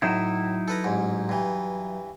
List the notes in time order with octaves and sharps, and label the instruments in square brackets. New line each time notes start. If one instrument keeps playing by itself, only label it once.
[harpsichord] A2 [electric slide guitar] F#3 D#4 E4
[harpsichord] A4 B4 A#5
A1 G#2
G2 E3